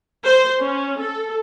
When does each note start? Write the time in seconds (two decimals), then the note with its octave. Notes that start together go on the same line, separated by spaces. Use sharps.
0.25 C5
0.61 C#4
1.00 A4